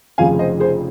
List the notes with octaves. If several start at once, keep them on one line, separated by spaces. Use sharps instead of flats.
F1 F2 C#3 F3 C4 F5 G#5
C5 D#5
G#4 C5